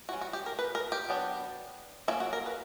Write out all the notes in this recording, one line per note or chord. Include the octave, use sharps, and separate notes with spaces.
E3 G3 C#4 F#4
F#4
G4
A#4
B4
A#4
G4
F#3 B3 D4
F#3 A#3 C#4 E4
F#4
A#4
B4